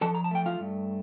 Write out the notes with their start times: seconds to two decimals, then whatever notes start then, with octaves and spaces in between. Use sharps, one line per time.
0.01 F3 A4 A5
0.15 A#5
0.24 A5
0.31 A3 G5
0.46 F4 F5
0.60 G2